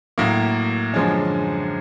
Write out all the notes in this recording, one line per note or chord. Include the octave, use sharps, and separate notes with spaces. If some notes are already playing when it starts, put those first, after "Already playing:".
A2 F#3 A#3
F#2 D3 F3 G#3 C#4